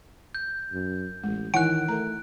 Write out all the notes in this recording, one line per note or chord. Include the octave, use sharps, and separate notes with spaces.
G6
F#2
A1 G#3
D#3 E3 E4 F#5 G#5 F#6 D7
A3 A#4 A#5